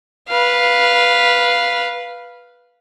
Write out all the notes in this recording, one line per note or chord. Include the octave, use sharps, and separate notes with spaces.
B4 F5